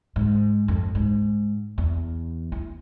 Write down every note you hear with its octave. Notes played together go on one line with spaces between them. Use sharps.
G#2
F2
G#2
E2
E4